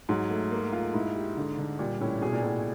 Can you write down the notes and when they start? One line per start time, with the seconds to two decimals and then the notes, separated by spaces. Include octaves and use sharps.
0.09 G#2 F#3
0.30 A3
0.51 A#3
0.72 F4
0.94 G#2 E4
1.15 G4
1.37 D3
1.58 D3
1.79 A#2 G3
2.00 A2 C#4
2.21 B2 G#4
2.33 A#2
2.43 A2 G#4